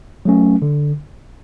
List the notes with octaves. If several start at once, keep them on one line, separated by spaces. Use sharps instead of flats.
F#3 A3 C#4
D3